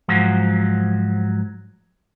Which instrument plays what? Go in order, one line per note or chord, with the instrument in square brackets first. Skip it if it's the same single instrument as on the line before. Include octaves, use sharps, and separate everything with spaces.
[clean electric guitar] G#2 F3 F#3